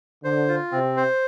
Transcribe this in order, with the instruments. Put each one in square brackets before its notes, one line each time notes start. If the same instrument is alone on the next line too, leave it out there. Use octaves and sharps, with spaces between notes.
[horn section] D3 [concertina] C5
[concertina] F4
[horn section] C3 [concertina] C4
[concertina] C5